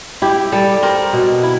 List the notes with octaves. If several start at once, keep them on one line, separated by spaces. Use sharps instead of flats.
E4 G4
G3 A4
C4 A#4
B2
E4